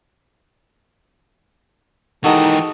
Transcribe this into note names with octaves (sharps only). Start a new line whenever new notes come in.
D#3 E3 G#3 D#4 F#4 G4 A4 D#5